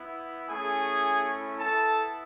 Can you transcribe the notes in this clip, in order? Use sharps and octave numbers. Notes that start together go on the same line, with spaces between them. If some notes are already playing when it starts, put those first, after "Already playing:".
Already playing: B3 E4
A3 C#4 E4 G#4 G#5
B3 E4 A4 A5